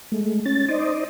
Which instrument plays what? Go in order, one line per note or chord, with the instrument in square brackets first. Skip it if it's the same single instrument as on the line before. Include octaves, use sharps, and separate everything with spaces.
[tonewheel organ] G#3 A3
C#4 A6
D#4 C5 D5 D#5